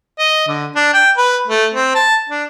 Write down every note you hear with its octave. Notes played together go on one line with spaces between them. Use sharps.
D#5
D3
D4
G5
B4
A3
C4
A5
D4